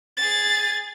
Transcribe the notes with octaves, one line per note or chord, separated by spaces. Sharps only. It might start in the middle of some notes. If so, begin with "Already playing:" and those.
G#4 A6